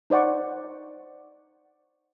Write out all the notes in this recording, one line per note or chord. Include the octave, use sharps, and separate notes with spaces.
D#4 C5 D5 F#5 C#6